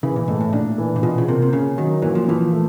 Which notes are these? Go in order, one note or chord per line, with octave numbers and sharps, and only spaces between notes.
C#3 E3
A#2
G#2 A3
A2
A#2 D4
E3
A#2
B2 F4
C#3
C3 A#3
C3
C#3 C#4
D#3 F#3
A#2 E3
F3
E3 F3
A3